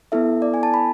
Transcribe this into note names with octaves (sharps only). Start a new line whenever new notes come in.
B3 E4 A4 E5
D5
G#5
A5
B5